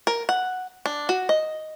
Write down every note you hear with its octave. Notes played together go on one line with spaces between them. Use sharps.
A#4
F#5
D4
F#4
D#5